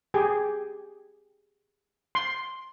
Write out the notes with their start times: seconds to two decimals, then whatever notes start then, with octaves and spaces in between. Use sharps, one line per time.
0.14 G4 G#4
2.15 C6